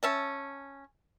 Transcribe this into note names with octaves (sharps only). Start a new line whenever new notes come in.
C#4 E5 A5